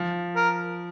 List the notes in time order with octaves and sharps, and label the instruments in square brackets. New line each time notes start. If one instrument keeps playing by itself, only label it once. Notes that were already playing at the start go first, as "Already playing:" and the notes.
Already playing: [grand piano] F3
[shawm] A#4